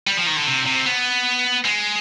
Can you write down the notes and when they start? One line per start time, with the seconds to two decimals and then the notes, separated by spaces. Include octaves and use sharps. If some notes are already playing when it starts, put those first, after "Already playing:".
0.07 G3
0.17 F3
0.27 D#3
0.36 D3
0.47 C3
0.66 C3
0.86 B3
1.65 G#3